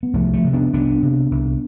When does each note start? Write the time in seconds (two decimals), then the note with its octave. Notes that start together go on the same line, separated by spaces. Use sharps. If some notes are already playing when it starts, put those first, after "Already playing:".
0.03 B3
0.13 C2 F3 A3
0.33 F3 A3
0.44 C3
0.53 B3 D4
0.73 C2 B3 D4
1.02 C3
1.31 C2